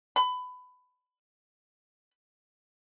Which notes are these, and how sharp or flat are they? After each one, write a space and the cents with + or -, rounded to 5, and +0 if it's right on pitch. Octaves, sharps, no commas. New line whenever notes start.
B5 +20